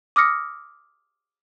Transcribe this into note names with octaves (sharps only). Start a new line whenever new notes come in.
D6 D#6 F6 A#6 C#7